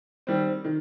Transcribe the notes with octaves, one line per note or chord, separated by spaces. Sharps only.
D#3 G3 C4
D#3